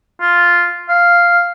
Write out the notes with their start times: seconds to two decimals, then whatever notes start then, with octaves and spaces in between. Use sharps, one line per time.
0.21 F4
0.89 F5